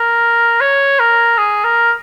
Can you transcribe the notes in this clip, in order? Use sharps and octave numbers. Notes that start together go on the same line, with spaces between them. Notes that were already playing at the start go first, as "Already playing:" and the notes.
Already playing: A#4
C#5
A#4
G#4
A#4